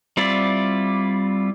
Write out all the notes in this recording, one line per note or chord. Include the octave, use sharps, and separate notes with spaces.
G3 C4 E4 F4 D5